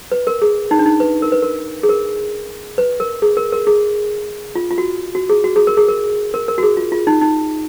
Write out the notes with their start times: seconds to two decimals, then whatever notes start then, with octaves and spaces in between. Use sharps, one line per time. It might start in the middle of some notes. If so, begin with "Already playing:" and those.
0.12 B4
0.27 A#4
0.42 G#4
0.71 D#4
0.79 D4
0.86 D#4
1.00 B4
1.22 A#4
1.32 B4
1.42 A#4
1.83 G#4
1.89 A#4
2.78 B4
3.00 A#4
3.22 G#4
3.37 A#4
3.52 A#4
3.67 G#4
4.55 F4
4.71 F4
4.78 F#4
5.15 F#4
5.29 G#4
5.44 F#4
5.56 G#4
5.67 A#4
5.77 G#4
5.88 A#4
6.34 A#4
6.48 A#4
6.58 F#4
6.63 G#4
6.77 F4
6.92 F4
7.07 D#4
7.21 D#4